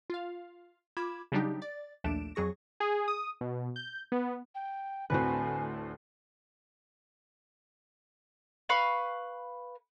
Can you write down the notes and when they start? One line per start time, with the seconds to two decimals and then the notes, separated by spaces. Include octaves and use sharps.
0.10 F4 F5
0.97 F4 B5 D6 G#6 E7
1.32 C#3 F#3 G3 D4 D#4 G4
1.62 D5 A6
2.04 A#1 D#2 A3 D4 D7 E7
2.35 F2 F#3 G#4 C#6 A#6
2.80 G#4
3.08 D#6
3.41 B2
3.76 G6
4.12 B3
4.55 G5
5.10 D2 A2 C4 F#4 B4 G#5
8.69 B4 F5 B5 C#6